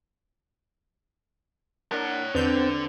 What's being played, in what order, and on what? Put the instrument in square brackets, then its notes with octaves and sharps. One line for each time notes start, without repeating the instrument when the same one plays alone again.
[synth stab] D4 A#4 [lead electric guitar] C#5 A5 [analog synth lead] F#5
[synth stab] E2 D4 G6 [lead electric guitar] D3 [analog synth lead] C4 [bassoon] B4